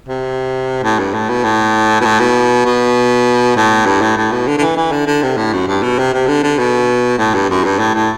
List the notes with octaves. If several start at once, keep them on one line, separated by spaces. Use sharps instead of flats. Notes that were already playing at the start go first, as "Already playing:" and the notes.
C3
A2
G2
A2
B2
A2
B2
A2
B2
B2
A2
G2
A2
A2
B2
D3
D3
E3
E3
D3
D3
C3
A2
F#2
G2
B2
C3
C3
D3
D3
B2
A2
G2
F#2
G2
A2
A2